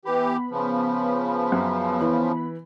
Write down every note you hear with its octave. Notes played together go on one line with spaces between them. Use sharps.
E3 B3 G4 B4 B5
C#3 F3
F#2
E3